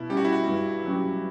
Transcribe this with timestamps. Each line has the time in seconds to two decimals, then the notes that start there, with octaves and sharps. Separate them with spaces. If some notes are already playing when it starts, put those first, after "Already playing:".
Already playing: B2 E4
0.09 G3 C#4 G4
0.17 F#4
0.25 E4
0.33 F#4
0.48 G2
0.85 F#3 C#4 G4